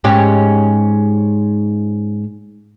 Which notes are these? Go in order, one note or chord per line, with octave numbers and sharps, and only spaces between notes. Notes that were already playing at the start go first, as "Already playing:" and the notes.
G#2 C#4 G4